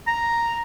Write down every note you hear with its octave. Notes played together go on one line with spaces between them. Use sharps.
A#5